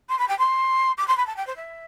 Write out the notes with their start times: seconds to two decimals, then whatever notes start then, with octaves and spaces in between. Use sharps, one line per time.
0.09 C6
0.19 B5
0.28 G5
0.39 C6
0.98 D6
1.08 C6
1.17 B5
1.27 A5
1.36 G5
1.47 C5
1.56 E5